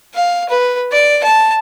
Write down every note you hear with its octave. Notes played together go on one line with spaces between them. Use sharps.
F5
B4
D5
A5